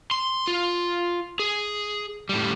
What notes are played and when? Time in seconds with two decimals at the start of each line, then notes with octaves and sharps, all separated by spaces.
0.11 C6
0.47 F4
1.39 G#4
2.29 A2 G3